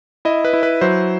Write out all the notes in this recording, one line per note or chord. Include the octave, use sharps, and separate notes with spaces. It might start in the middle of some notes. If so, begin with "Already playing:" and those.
E4 D#5
B4
E4
B4
F#3 C5